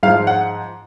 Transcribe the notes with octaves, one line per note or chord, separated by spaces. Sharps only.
G#2 F3 F5
F#5